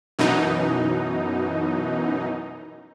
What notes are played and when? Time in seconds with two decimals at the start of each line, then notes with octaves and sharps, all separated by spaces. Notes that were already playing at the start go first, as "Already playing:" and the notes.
0.19 F#2 B2 E3 D#4